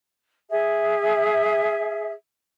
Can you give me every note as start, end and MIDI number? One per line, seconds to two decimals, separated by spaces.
0.50 2.11 68
0.50 2.11 76